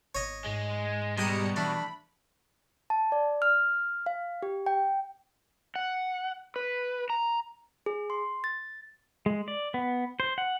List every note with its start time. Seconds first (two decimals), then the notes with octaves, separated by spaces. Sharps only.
0.15 G#1 C#5 D#5
0.46 G#2 G#3
1.18 B2 G3 G#3 G5 A#5 D#6 C#7
1.56 E3 A3 D4 B5
2.90 A5
3.12 D5
3.42 F6
4.06 F5
4.43 G4
4.66 G5
5.76 F#5
6.56 B4
7.10 A#5
7.86 G#4
8.10 C6
8.44 A6
9.26 G#3
9.48 D5
9.74 B3
10.20 C5
10.38 F#5